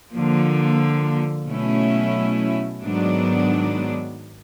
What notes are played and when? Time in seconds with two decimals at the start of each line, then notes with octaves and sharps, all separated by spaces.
0.11 D3 F3 A#3
1.47 B2 F#3 A3 C#4 E4
2.82 G#2 D#3 F#3 B3 D4